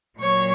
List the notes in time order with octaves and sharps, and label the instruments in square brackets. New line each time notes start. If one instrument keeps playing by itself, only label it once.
[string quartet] A#2 F#3 C#5